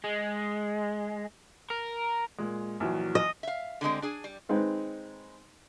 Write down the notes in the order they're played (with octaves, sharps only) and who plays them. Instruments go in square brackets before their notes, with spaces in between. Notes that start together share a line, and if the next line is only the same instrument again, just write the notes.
[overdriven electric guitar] G#3
A#4
[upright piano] A#2 G#3
A#1 E3 F#3
[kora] D#5
[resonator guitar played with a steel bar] E5 F5
D3 G3 G#3 C4
D4 G#4 G#5
G3
[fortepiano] D#3 G#3 C4 D#4 B4